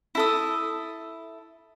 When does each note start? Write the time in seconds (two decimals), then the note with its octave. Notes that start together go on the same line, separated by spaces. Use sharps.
0.15 E4 A4 D#6